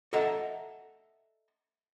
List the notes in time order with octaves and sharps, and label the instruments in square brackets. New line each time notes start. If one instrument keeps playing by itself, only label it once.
[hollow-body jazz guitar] A4 D#5 E5 F#5 A#5